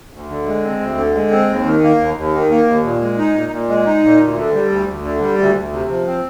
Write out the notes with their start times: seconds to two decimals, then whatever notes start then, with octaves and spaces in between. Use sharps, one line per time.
0.13 D2
0.30 D3
0.47 G#3
0.64 C4
0.80 D2
0.97 D3
1.15 G#3
1.31 C4
1.49 D#2
1.66 D#3
1.83 A#3
1.99 D#2
2.16 D#2
2.34 D#3
2.51 A#3
2.67 D#2
2.84 A#2
3.01 G#3
3.18 D#4
3.35 A#2
3.52 A#2
3.69 G#3
3.86 D#4
4.04 A#2
4.20 D2
4.37 D3
4.55 G3
4.71 D2
4.88 D2
5.05 D3
5.22 G3
5.39 D2
5.57 D2
5.73 C3
5.90 F3
6.07 C4